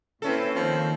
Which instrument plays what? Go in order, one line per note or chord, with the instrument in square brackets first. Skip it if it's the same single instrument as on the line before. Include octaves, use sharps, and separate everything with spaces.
[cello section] A#2 E4 B4 [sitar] C4 C#4 A4
[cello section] D#3 A#3 [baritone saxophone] F3